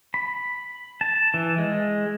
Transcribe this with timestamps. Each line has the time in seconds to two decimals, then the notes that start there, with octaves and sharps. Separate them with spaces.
0.14 B5
1.01 A5
1.34 E3
1.58 G#3